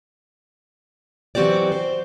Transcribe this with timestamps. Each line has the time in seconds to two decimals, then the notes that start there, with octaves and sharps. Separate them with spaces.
1.35 E3 F#3 C4 F#4 G4 D5
1.72 C5